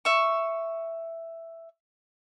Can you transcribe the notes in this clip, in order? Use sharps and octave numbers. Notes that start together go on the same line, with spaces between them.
E5 C#6